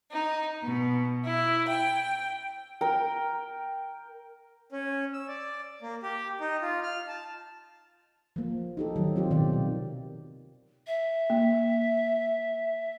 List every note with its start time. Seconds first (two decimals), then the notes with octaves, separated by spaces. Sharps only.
0.12 D#4
0.63 B2
1.25 E4
1.69 G5
2.81 A#4 G5
4.72 C#4
5.13 E6
5.28 D5
5.82 A#3
6.03 G4
6.40 D#4
6.62 F4
6.83 F6
7.08 A5
8.36 F3 A#3
8.77 D#4 G4 A4
8.96 D#3 F#3
9.16 C4 F4 G4
9.31 B2 D#3 C4 D5
9.53 C3
10.86 E5
11.30 A#3